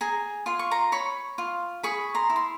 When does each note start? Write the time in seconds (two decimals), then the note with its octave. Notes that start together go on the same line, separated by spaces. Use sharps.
0.01 G#4 G#5 A#5
0.46 F4 C6
0.59 C#6
0.71 A#5 C6
0.92 C#5 B5 C#6
1.38 F4
1.83 G#4 B5 C#6
2.15 A#5 C6
2.30 E4
2.36 C6